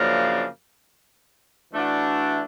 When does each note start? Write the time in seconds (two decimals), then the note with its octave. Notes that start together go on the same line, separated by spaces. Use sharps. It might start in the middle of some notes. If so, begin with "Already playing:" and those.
Already playing: F#2 C#3 F3 A#3 D4
1.72 E3 A3 D4 F#4